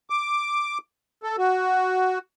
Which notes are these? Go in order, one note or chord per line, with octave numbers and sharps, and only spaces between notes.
D6
A4
F#4